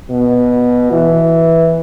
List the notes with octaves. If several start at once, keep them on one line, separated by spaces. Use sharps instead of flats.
B2
E3